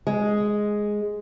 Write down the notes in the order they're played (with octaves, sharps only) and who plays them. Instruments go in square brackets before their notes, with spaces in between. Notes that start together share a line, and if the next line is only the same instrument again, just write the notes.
[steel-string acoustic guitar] G#3